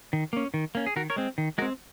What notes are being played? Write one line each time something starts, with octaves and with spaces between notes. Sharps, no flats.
D#3
A#3 C#4
D#3
A#3 C#4
G#4
D#3 F#4 A#4
A#4 C#5
G#3 C4
D#3
G#3 C4 F#4 A#4